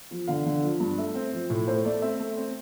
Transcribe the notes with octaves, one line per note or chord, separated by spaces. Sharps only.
F3
D3 F5
D3
F3
G2
A3 E5
C4
F3
A2
A3 C5
A3 D5
C4 E5
A3
C4